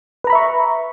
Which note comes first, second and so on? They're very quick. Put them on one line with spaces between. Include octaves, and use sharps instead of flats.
B4 A#5 B5 E5 C#6